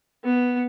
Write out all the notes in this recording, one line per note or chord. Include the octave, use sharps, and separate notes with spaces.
B3